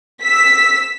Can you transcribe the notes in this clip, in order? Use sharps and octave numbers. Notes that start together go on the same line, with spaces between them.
E6 B6